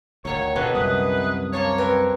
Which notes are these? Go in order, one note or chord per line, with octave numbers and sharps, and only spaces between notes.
D2 A#2 D#3 F#3 C#5
F2 B2 D3 F#4 B4
C2 F#2 C3 D#3 E3 B4 D#6
F3 A#3 D4 C#5
C4 A#4 B4